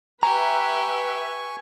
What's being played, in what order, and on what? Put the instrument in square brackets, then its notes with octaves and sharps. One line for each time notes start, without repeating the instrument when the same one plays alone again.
[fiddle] G4 [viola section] B4 E5 [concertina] G#5 C#6 [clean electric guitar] A#5